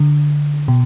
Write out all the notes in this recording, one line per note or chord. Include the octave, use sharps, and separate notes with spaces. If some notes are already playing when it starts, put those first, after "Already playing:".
Already playing: D3
B2